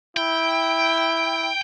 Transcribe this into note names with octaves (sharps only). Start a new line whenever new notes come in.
E4 G5